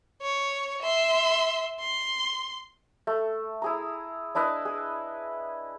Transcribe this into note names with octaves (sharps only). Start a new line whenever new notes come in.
C#5
E5 C6
C6
A3
E4 G#4 A#5
D4 E4 B4 D#5
G#4